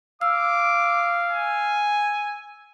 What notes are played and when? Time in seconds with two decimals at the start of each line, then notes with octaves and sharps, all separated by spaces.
0.21 F5 D6 E6
1.31 G#5